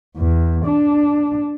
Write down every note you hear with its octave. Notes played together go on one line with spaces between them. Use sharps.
E2
D4